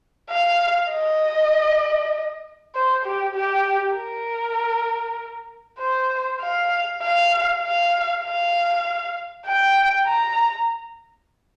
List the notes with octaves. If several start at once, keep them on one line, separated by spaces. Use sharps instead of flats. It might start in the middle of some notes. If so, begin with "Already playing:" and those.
F5
D#5
C5
G4
G4
A#4
C5
F5
F5
F5
F5
G5
A#5